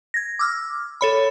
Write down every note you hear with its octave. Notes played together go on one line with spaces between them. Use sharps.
G#6 A#6
D6 E6 F6
A4 C#5 B5